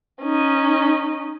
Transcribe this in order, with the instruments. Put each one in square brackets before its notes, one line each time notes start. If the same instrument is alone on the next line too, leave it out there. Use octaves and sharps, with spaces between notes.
[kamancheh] C#4 D#4